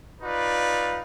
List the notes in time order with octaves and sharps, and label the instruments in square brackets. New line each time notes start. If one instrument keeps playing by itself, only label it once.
[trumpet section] D#4 F4 B4 D5